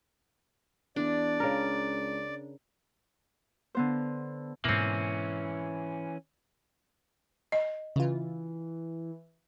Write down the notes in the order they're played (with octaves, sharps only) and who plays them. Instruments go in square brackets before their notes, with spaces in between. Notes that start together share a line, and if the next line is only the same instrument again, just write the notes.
[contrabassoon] E2 [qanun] D4 [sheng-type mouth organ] D5
[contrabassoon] C#2 [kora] C#3 A#4
[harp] D3 B3 C5
[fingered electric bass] G#2 B2 [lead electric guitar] E3 C#4 [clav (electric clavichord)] A#3 C4
[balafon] D#5
[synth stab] C#3 F4 [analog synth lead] E3